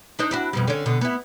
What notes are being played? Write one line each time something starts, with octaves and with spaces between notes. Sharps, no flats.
D4 D#4 C5
D4 E4 F#4
F2 B2 G3
D3 C#4
B2 D3
B3 E4